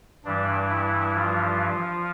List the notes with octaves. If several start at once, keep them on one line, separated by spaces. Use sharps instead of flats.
G2 E3 G3 D4
E4
F3 F4